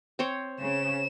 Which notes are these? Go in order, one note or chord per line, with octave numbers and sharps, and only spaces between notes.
C4 C5 C#5
C#3 E7